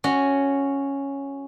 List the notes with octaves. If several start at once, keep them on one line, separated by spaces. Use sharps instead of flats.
C#4 F#4